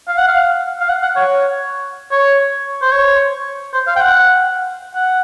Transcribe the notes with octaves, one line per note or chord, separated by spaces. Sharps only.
F5
F#5
F5
F5
F#5
F#5
C#5
C#5
C5
C#5
C5
F5
G5
F#5
F#5